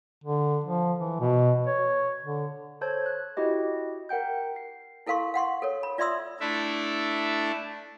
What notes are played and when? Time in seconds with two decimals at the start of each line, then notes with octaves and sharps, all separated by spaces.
0.24 D3
0.64 F3
0.99 E3
1.20 B2
1.66 C#5
2.23 D3
2.81 A4 C5 C#5 A5 G6 G#6
3.06 F#6
3.37 E4 F#4 G4 D#5
4.09 A#4 F#5 G5 G6
4.56 C7
5.06 E4 A4 A#4 F5 C6 C#6
5.34 F5 F#5 C6 C#6
5.62 A4 A#4 C#5
5.83 B5
5.98 F4 D5 E5 C6 D#6 E6
6.40 A3 D4 E4 E5